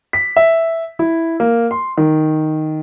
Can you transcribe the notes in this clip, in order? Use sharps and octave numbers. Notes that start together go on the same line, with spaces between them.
B6
E5
E4
A#3
C6
D#3